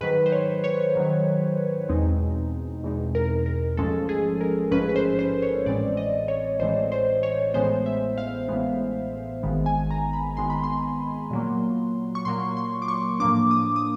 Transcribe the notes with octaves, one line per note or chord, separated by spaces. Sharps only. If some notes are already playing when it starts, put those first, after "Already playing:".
G#2 D#3 F#3 B4
C5
C#5
C#5
G#2 D#3 F#3
E2 B2 G#3 C4 D#4
E2 B2 G#3 C4 D#4
A#4
A#4
A1 G#2 F3 G#3 C#4 A4
G#4
A#4
A1 G#2 F3 G#3 C#4 B4
B4
C5
C5
C#5
A1 A2 E3 G#3 C4 D5
D#5
C#5
A1 A2 E3 G#3 C4 C5
C5
C#5
A1 A2 E3 G#3 B3 C5
E5
F5
A1 A2 E3 G#3 B3
G#1 G#2 D#3 G#3 B3
G#5
A#5
B5
G#1 G#2 D#3 G#3 B3 C6
B5
C6
A#2 F#3 A#3
C#6
A#2 F#3 A#3 C6
C6
D6
C#6
A2 F3 A#3 D4 D6
D#6
D#6